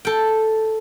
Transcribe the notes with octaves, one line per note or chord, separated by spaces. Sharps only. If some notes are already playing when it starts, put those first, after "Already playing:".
A4 G5